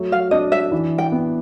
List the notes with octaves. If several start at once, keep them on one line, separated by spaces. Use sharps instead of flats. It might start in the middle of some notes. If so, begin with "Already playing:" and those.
Already playing: F#3 A3
F5
D4 D#5
E5
E3
G5
B3